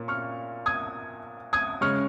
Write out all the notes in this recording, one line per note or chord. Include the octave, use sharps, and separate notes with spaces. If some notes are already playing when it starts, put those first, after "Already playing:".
Already playing: A#2 A#3 C#4
C#6 F6
D#6 G#6
D#6 G#6
C#3 G#3 C#4 C#6 F6